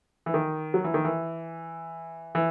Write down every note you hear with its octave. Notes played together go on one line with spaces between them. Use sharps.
E3
D#3
F#3
E3
D#3
E3
E3